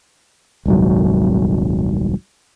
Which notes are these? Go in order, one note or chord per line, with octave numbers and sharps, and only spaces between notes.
D#1 C2 G#2 F#3